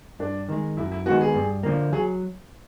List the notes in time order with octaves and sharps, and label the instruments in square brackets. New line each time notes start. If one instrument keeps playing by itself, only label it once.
[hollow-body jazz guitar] G2 [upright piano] D4
[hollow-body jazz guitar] D#3 G#3
[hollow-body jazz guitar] F#2 [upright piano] E4
[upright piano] E4
[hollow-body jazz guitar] D#3 G#3 B3 [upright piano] F#4
[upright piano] G#4
[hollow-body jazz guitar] G2
D3 F3 A#3
[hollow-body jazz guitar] F#3 [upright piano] G#4